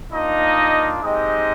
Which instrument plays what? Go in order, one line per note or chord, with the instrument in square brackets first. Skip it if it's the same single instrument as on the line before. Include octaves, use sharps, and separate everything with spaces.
[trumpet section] A#3 D4 D#4 F4 D#5
G#3 C4 D#4 G4 D#5